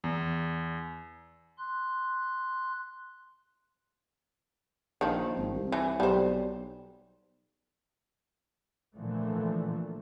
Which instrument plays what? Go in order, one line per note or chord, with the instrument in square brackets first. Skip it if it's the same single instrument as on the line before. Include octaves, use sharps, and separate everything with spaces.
[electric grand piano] E2
[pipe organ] C6 F#6
[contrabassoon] A#1 [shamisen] D#3 F3
[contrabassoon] G#1
C2
[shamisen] E3
[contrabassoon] B1 [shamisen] G3 C5
[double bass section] A#2 D3 E3 F3 A3